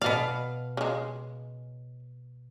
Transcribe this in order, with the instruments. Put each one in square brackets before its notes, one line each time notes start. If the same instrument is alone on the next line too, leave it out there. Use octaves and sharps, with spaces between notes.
[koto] B2 F5 [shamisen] D5 D#5
[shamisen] C#3 G#3